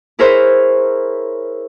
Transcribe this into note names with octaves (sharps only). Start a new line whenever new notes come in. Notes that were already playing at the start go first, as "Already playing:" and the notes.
E4 G#4 A#4 C5 C#5 E5